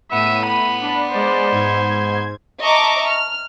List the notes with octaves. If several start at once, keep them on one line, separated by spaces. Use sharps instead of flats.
A2 B3 E5 D#7
B5
D4
G#3 C5 D5
G#2 G#6
D#5 E5 A5 A#5 C#6 D6
F6